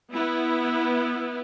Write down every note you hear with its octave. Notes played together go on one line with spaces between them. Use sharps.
B3 E4